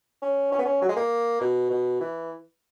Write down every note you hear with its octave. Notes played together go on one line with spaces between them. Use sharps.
C#4
C#4
B3
C#4
F#3
G#3
A#3
B2
B2
E3